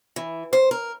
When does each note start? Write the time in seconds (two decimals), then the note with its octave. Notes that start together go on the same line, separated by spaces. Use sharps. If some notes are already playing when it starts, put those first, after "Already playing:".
0.16 E3
0.53 C5
0.71 A#4